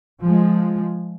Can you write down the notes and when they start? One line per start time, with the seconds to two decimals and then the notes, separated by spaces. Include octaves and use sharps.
0.23 F3 G#3